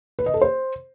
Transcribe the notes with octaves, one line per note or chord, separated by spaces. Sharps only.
B4
D#5
A4
C5